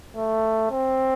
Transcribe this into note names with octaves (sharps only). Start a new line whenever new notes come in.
A3
C4